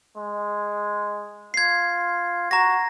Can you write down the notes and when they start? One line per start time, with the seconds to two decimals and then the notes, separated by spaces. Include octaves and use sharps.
0.18 G#3
1.54 F4 G#6 C7
2.51 F#4 A#5 A#6